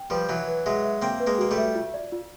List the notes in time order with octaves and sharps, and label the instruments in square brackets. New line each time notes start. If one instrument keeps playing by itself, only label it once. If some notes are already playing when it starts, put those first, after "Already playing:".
Already playing: [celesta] G5
[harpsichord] F3 G3 [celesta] B4
[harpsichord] E3 F#3 [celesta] E5
[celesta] B4
[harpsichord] F#3 G#3 [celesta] E5
[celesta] E5
[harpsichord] A#3 C4 [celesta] G5
[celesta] B4
[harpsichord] G#3 A#3
[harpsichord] A#3 [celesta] F#4
[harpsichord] G3 A3
[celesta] E5
F4
D5
F4